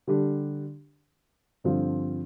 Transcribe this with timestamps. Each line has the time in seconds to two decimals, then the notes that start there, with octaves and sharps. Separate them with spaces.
0.07 D3 G3 D4 G4
1.64 G2 D3 F3 C4 F4